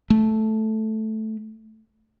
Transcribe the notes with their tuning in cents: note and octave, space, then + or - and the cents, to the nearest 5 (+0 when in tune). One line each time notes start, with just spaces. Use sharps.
A3 -5